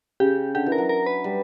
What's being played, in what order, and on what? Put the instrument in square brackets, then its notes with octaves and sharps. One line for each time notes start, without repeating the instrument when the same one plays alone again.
[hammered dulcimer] C#3 [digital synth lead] G4
[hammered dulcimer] D3 [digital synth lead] G4
[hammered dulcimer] E3
[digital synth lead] A#4
[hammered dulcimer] F#3
[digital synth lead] A#4
B4
[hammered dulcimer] G3